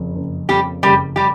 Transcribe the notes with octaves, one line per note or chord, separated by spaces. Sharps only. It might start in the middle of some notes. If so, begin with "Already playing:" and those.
Already playing: F#1 F2
F#1
F2 G3 G4
F#1 G3 G4
G3 G4